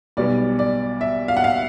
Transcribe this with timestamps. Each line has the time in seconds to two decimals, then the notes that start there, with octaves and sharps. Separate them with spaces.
0.17 B1 B2 G3 B3 D5
0.59 D5
1.01 E5
1.28 F5
1.37 F#5
1.44 F5